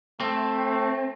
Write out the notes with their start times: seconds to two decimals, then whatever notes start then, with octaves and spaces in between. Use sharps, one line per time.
0.20 A3 C4